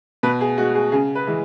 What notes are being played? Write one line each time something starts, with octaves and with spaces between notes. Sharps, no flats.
B2 B4
G#4
G#3 F#4
G#4
C#3 G#4
B4
E3 G#3